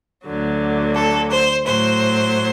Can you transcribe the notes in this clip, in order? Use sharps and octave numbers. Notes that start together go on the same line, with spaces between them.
D2 D3 F#3
A4
C5
A2 F#3 C5